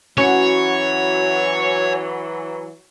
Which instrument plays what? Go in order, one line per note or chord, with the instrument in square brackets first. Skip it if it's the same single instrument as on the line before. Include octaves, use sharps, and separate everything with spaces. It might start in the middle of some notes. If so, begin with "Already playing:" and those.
[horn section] E3 F#3 [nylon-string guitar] C#4 [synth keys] F#4 F#5 [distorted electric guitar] C#5